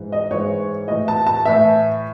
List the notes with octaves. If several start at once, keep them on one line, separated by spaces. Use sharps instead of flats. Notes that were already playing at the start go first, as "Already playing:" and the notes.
Already playing: G#2 E3
D#5
G#2 E3 C#5
A2 E3 D#5
A5
A5
A2 E3 E5